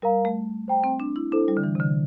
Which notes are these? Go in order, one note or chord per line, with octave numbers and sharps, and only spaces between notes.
G3 A#4 F5 A#5
A3
C5 G5 A#5
C4
D4
E4
D4 E4 A4 C5
G3
D3
E3
C3
D3